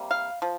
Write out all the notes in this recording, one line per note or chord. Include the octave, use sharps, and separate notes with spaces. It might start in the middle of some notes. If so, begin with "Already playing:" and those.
Already playing: C3 G3 A#3
F5
F3